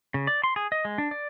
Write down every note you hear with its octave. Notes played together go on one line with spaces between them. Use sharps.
C#3
D5
C6
G#4
D#5
G#3
D4
D5